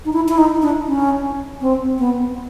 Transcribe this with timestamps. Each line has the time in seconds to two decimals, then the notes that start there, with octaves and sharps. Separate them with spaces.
0.05 D#4
0.13 E4
0.29 E4
0.38 D#4
0.62 D4
0.87 C#4
1.61 C4
1.99 B3